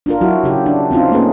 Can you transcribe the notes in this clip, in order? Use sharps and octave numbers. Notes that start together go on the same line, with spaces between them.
D4 F4 A#4
F#3 E4 F#4
C#3 G4
D4
C4 C#4 D#4 F4
A3 A#3 C#4 G#4 B4